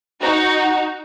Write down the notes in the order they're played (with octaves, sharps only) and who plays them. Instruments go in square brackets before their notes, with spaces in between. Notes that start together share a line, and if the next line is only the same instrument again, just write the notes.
[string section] D#4 F#4